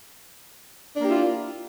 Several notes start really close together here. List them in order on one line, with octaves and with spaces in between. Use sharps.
D4 A#3 G4 E4 F4